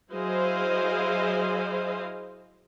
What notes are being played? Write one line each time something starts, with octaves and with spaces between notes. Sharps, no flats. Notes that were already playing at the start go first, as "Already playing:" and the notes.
F#3 E4 G#4 C5 D#5 F5